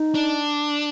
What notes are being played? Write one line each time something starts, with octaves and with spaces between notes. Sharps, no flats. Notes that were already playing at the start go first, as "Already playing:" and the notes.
Already playing: D#4
D4